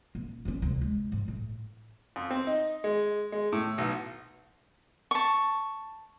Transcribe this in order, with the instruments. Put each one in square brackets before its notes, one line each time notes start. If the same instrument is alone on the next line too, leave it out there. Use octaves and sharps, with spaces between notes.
[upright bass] D#1
G3 C#4
D2 C3
G#3
G#2
A2
[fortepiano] F2
C4
D#4
G#3
G#3
A2
B1
[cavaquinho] A5 C#6